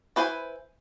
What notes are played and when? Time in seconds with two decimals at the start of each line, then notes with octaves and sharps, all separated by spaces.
0.16 E4 B4 C5 D#5 G#5